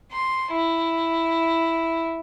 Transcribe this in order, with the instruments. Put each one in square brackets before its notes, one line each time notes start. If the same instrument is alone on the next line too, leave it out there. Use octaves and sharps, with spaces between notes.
[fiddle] C6
E4